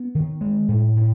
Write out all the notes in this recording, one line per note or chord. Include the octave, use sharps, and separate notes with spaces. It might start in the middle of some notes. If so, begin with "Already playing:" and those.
Already playing: B3
D#3
G#3
A2
A2